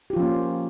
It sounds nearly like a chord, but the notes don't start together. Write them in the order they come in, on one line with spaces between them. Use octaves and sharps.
G4 F4 F3 C#4 A#3